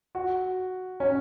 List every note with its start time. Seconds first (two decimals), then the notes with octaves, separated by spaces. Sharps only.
0.15 F#4
1.00 C#4